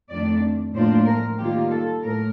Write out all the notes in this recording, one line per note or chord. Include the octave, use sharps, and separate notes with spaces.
F2 D#3 A3 D4 D5
A2 F3 A#3 D4 F4 C5
A#4
D#3 G3 A#3 F4 G4
A4
A2 A#4